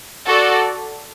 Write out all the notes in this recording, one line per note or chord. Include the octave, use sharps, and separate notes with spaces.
F#4 A4 D5